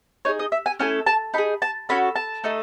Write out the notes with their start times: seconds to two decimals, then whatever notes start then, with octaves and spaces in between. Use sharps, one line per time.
0.25 D#4 G#4 C#5
0.39 D#5
0.52 E5
0.66 G#5
0.80 A3 C#4 E4 A4 G#5
1.06 A5
1.34 D#4 B5
1.38 G#4
1.62 A5
1.89 C#4 F#4 A4 B5
2.16 A5
2.44 A3 D#4 A4